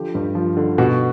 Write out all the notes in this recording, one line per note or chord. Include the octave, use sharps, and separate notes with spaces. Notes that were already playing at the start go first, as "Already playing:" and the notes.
Already playing: D3 F3 G4
G2
F3
D3
B2 F#4